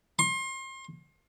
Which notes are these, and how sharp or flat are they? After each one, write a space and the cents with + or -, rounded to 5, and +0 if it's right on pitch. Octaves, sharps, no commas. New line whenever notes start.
C6 +35